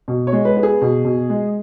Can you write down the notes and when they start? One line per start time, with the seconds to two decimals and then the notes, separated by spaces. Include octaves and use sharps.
0.08 B2
0.27 C#5
0.33 G#3
0.45 B4
0.57 B3
0.63 G#4
0.82 B2
1.05 B2
1.30 G#3